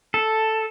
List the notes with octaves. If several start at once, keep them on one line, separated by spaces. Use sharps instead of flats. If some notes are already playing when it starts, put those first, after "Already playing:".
A4